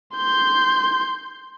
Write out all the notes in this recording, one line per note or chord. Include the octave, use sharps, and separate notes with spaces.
C6 G6